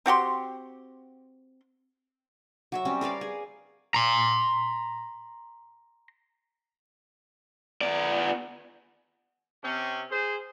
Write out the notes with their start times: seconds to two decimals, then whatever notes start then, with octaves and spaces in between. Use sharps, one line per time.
0.06 C4 F#4 G4 C6
2.72 F#3 F#4 E5
2.85 G3 C4 C#4
3.01 A#4 B4 D5 F5
3.21 G#4
3.94 A#5 C6
7.81 B3 D5
9.64 C3 C4 C#4
10.10 G#4 C5